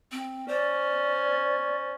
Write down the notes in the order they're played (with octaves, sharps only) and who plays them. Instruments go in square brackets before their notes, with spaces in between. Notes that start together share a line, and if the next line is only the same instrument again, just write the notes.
[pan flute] C4
[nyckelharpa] C#4 [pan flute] C5 [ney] D5